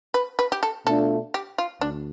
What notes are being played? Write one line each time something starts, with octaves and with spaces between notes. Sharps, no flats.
B4
B4
G4
A4
B2 A3 D4 F4 A4
G4
F4
D2 D4